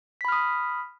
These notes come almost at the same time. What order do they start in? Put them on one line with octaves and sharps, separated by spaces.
B6 B5 F6 D#6